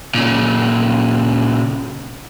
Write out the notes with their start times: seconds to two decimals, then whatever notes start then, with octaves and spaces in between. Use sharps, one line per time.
0.15 A#2 C#3